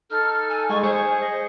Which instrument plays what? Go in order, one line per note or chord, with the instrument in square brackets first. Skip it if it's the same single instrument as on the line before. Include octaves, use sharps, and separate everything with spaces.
[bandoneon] D#4 [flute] A4 [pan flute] F6
[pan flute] G#5
[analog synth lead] G#3 [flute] G#5 [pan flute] C#6
[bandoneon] G#4 [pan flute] C5 [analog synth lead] C#6
[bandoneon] G#4 D#5